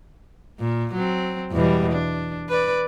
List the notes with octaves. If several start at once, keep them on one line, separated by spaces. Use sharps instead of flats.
A#2
F#3 C4
E2 B2 G3
D4
B4 D5